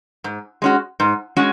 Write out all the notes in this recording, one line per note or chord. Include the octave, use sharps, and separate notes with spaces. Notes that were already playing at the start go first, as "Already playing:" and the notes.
G#2
G#3 C#4 F#4
G#2
G#3 C#4 F#4